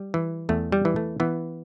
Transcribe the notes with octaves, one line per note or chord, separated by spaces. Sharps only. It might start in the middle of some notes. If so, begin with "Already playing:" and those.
Already playing: G3
E3
E2 A3
G3
E3
A3
E3 B3